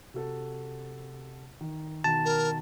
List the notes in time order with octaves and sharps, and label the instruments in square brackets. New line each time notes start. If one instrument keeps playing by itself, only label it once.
[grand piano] C3 F#4 A4
D#3
[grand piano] B2 D#3 [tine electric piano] A5
[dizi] A#4